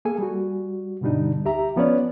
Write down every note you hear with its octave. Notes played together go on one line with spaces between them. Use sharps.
A#3 G#4 A4 G#5
G3 F#4
G2 B2 D3 G3 D4 D#4
D2 G4 E5 A#5
F3 B3 C#4 C#5 D5